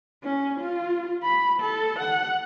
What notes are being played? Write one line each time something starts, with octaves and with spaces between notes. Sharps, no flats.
C#4
F4
B5
A4
F#5